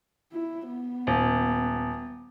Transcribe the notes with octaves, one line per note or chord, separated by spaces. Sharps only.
E4
B3
D#1